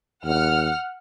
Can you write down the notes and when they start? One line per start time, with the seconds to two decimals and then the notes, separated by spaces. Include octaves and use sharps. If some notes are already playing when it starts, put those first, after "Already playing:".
0.25 D#2 F#5 F6